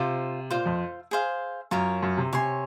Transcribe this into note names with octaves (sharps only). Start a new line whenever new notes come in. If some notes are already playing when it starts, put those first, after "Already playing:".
Already playing: C3 F4 C5 F5
A#2 F4 C5 F5
F2
G#4 C5 F5
F#2 F4 A#4 C#5
F#2
C3
C3 C#5 G#5 C6